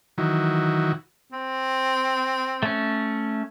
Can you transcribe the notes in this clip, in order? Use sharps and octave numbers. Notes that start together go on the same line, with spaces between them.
D#3 E3 F#3
C4
A3 C#4